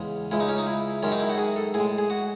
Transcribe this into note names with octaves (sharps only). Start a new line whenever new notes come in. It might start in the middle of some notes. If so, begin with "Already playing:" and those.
Already playing: E2 C#3 G#3
C#2 C#3 G#3 E4
D#4
C#4
D#4
E4
F#2 D#3 G#3 C#4
D#4
E4
F#4
G#4
A4
A2 G#3 G#4
G#4
F#4